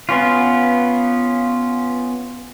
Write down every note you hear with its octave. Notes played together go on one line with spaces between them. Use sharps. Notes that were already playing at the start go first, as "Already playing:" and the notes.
B3 C#4 F4